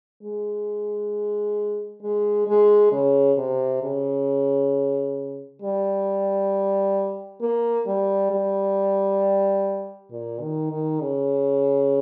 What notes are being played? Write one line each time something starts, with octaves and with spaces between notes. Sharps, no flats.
G#3
G#3
G#3
C#3
C3
C#3
G3
A#3
G3
G3
A#2
D#3
D#3
C#3